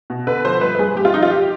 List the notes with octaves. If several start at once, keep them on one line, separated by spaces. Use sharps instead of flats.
B2
D3 B4
F3 C5
G2 B4
B4
G2 G#4
G2 G4
F4
F3 D#4
F4
G4